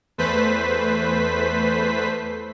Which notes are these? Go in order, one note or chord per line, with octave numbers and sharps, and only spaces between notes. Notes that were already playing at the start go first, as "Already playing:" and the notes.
E2 A3 B4 C5 B6